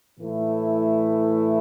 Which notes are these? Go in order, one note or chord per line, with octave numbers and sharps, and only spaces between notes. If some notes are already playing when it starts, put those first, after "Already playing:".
A2 E3 A3 E4